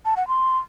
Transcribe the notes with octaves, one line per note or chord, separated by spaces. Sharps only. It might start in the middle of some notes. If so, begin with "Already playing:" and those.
A5
F#5
C6